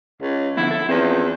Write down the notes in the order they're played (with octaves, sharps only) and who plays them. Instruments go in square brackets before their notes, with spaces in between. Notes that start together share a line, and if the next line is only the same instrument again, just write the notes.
[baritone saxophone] C#2
[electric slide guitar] D3 F3 B3 [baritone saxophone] E4
[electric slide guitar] A4
[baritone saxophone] E2 [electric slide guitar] C4 C#4 F4